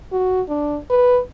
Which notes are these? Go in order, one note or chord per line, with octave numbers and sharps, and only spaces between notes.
F#4
D4
B4